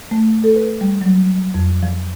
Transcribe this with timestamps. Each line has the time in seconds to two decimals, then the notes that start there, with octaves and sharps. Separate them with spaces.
0.11 A3
0.44 A4
0.56 B4
0.81 G3
1.01 F#3
1.54 F2
1.83 F3